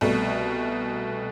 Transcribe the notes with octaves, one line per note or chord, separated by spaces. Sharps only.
C2 B2 A3